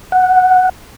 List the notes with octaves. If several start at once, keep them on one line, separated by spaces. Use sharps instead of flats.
F#5